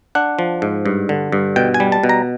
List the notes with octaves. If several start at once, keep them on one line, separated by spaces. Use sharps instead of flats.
D4 F#5
F3
G#2
G2
D3
G2
B2 G5
G#5
G3
A5
B2
A#5